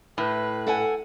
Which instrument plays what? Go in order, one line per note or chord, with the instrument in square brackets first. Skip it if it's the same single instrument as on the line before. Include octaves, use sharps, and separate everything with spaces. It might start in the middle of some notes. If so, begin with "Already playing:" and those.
[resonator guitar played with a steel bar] A2 [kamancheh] B4
[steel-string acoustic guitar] A4 F#5 G#5